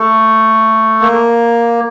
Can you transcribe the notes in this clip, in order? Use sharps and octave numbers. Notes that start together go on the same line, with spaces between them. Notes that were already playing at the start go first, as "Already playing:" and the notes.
Already playing: A3
A#3